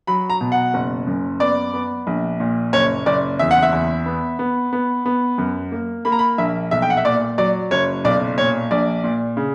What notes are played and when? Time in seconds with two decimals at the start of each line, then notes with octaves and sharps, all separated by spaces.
0.07 F#3 B5
0.30 A#5
0.41 B2
0.52 F#5
0.74 F#1
1.07 F#2
1.40 B3 D5
1.74 B3
2.07 A#1
2.40 A#2
2.73 F#1 C#5
3.06 F#1 D5
3.39 E2 E5
3.51 F#5
3.63 E5
3.72 E2
4.06 B3
4.39 B3
4.73 B3
5.06 B3
5.38 F#2
5.72 A#3
6.05 A#3 B5
6.12 A#5
6.19 B5
6.38 A#1 E5
6.71 B1 E5
6.82 G5
6.90 F#5
6.97 E5
7.04 A#2 D5
7.38 F#3 D5
7.71 F#1 C#5
8.04 B1 D5
8.38 A#2 C#5
8.71 A#1 D5
9.04 A#2
9.37 C#3